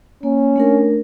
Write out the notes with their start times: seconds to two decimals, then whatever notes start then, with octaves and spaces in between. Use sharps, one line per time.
0.23 A#3 C#4
0.56 A3 D4 A#4